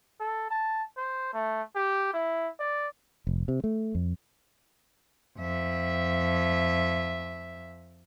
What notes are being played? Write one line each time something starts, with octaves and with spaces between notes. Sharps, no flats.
A4
A5
C5
A3
G4
E4
D5
F1
C3
A3
F2
F2 E5